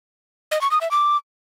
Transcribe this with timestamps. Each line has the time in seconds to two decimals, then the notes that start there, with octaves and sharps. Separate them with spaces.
0.51 D#5
0.61 C#6
0.71 D#6
0.81 E5
0.91 D6